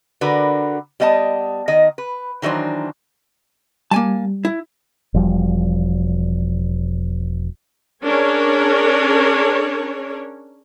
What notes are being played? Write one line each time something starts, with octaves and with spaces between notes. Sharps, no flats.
D3 F#4 A#4 B4
G3 B3 D#5 G5 A5
D#3 D#5
B4
D#3 E3 F#3 D4 C5
G3 A#3 G#5 A5
E4
E1 F3 G3
C#4 D4 G#4 A#4 C#5